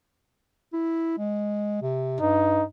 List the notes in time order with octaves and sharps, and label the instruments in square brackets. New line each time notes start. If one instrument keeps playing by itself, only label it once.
[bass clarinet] E4
G#3
C3
[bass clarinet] G2 [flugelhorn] D#4